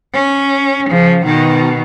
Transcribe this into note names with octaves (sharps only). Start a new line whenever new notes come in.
C#4
C#3 F3
B2 D#3